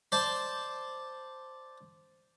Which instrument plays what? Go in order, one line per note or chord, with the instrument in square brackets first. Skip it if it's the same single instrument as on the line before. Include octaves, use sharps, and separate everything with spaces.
[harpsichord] C5 D5 A5